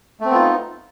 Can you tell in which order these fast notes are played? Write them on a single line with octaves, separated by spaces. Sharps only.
A3 C4 B3 F4 D#4